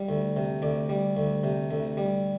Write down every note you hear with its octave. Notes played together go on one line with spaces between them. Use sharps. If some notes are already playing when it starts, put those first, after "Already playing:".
Already playing: G3
D2
C3
D2 D5
G3
D2
C3
D2
G3